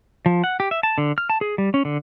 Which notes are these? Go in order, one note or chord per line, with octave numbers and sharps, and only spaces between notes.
F3
F#5
G4
E5
A5
D3
F6
A5
G#4
G3
C#4
D3